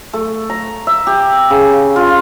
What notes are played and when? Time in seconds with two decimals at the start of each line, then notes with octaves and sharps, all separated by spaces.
0.13 A3
0.50 A#5
0.87 E5
1.07 G4
1.50 C#3
1.96 F4